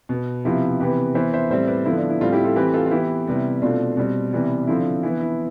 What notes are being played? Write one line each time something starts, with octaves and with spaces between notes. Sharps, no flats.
B2 B3
C3 F3 B3 E4 G4
C3 E3 B3 G4 B4
E3 B3 C5 E5
C5 E5
A2 G3 C4 C5 E5
B4 D5
D3 F3 B3 E4
D4
E4
A2 G3 C4 D4 F4
E4 G4
F4 A4
E3 A3 C4 G4 B4
F4 A4
F4
E3 B3 E4 G4
C3 G3 B3
B2 A3 C4 D4 F4
B2 G3 C4
C3 E3 G3 B3
D3 F3 C4 E4
D4
E3 B3 E4
E4